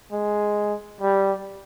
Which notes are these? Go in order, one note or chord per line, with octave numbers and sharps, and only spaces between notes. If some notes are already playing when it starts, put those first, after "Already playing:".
G#3
G3